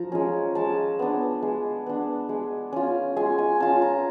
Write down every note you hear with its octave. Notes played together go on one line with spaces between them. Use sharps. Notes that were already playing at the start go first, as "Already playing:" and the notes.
Already playing: F3 A#5
G#3 C#4
G#3 A5
B3 D4
G#3
B3 D4
G#3
C#4 F4
G#3 G#5
G#5
C#4 F4 A5
A#5